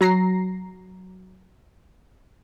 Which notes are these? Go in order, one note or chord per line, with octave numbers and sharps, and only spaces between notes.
F#3 A#5 A#6 C7